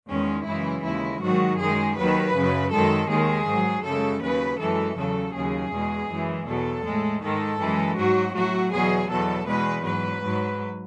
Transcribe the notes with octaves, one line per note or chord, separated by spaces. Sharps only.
E2 D#3 G#3 C#4
F#2 C#3 E3 G#3 E4
D#2 C#3 G#3 E4
G#2 D#3 F#3 F#4
F#2 D#3 G#3 G#4
D#2 D#3 F#3 B4
F#2 C#3 F#3
F#2 D#3 G#3 A4
D#2 D#3 G#3 G#4
G#2 F#3
F#2 C#3 G#3 A4
D#2 C#3 F#3 B4
F#2 E3 G#3 A4
E2 C#3 F#3 A4
D#2 C#3 F#3 G#4
E2 B2 G#3
F#2 E3 G#3
E2 B2 F#3 A4
A2 G#3
G#2 D#3 G#3 A4
F#2 E3 G#3
G#2 F#3 F#4
A2 F#3 F#4
E2 B2 F#3 G#4
E2 B2 F#3 A4
E2 B2 G#3 B4
G#2 F#3 B4
G#2 F#3